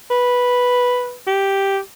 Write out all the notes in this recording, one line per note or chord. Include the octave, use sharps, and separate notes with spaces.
B4
G4